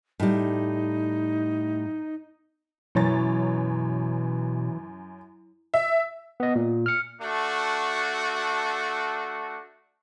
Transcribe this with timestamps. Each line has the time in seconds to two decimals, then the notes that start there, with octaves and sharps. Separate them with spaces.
0.20 A2 G3 D#4
2.95 F#2 B2 E3 E4 C#5 A#5 A6
5.74 E5
6.40 B3 D#5
6.56 A#2
6.86 F6 C#7
7.22 A3 D4 F#4